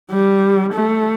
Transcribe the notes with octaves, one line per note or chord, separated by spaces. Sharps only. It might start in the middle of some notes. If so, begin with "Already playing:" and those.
G3
A3